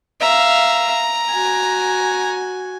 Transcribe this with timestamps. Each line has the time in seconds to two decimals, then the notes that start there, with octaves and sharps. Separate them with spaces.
0.21 E5 F5 A#5
1.31 F#4 G#5